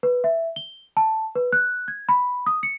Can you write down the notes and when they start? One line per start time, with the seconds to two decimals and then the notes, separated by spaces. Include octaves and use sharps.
0.03 B4
0.24 E5
0.56 G7
0.97 A5
1.35 B4
1.53 F#6
1.88 G#6
2.09 B5
2.46 D#6
2.63 C#7